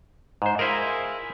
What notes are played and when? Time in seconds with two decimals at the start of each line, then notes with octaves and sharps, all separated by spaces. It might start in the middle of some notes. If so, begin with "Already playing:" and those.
0.42 G#2 C5
0.59 E4 F4 G#4 A#4 C5 D#5